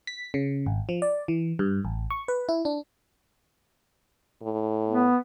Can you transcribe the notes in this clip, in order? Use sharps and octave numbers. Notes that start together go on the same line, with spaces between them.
B6
C#3
G#1
F3
D5
E3
G2
A1
C#6
B4
E4
D4
A2
B3